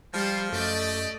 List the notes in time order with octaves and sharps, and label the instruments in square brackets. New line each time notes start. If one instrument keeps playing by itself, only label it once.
[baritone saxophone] F3 [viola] G3 [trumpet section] F4 C5
[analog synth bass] F#2 [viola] A3 D#5 [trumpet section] G4 D5